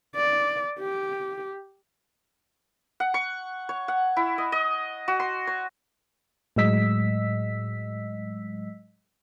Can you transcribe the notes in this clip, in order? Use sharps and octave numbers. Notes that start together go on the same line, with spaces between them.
D5
G4
F#5
C#6
C#5
F#5
E4
D#5
D#5
F#4
C6
C#5
A2 F#3 G#3 D#5 E6 B6